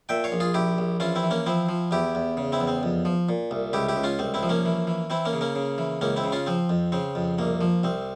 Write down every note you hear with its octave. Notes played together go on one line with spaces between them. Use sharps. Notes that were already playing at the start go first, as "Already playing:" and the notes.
A#2 E5 G5
C#5 F5
A#1
F4 G#4
A#1 E4 G4
A#1
E3 C#4 F4
C4 E4
E3
A#3 C#4
F3 C4 E4
F3
E2 E4 G4
E2
C#3
C4 E4
E2
C4
F2
F3
A#2
C2
C#2 E4 G4
E4 G4
C#2
C#4 F4
C2 C4
C4 E4
F3
A#3 C#4
E3
E3
E3 C4 E4
A#3 C#4
C#3
A#3 C#4
C#3
E3
C#2 A#3 C#4
C4 E4
C#3
C#4 F4
F3 C4
F2
C#3 C4
F2
C2 A#3
F3
C2 C4